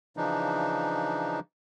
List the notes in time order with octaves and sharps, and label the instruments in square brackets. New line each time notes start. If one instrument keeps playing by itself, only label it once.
[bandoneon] C#3 E3 F3 D4 D#4